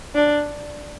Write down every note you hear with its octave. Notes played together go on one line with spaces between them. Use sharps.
D4